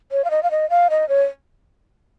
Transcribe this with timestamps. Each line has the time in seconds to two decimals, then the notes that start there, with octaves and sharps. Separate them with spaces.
0.12 C#5
0.24 F5
0.31 D#5
0.43 F5
0.51 D#5
0.70 F5
0.90 D#5
1.09 C#5